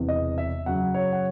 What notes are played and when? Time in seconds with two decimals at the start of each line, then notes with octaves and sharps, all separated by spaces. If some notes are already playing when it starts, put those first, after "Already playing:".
Already playing: E1 E2 C3
0.09 D#5
0.38 E5
0.66 F#2 C#3 F#3 F#5
0.94 C#5
1.13 F#5